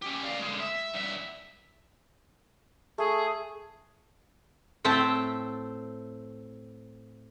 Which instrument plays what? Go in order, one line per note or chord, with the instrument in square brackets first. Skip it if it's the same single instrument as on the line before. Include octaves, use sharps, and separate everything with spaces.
[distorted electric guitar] C#4 G4
D5 F5
D3 G#3
E5
G2 E5
[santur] A3 [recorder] G#4
[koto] A2 C4 E5 G5 A5